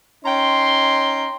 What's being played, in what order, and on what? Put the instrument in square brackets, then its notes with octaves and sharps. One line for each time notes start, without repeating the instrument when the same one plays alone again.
[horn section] C#4 D#4 G5 A#5 C6